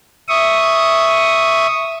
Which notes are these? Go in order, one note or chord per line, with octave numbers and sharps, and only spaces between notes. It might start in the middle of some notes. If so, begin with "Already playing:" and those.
E5 C#6 D#6